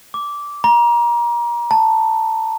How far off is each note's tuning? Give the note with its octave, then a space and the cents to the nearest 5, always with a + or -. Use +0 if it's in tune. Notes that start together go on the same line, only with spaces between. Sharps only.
D6 -15
A#5 +30
A5 +15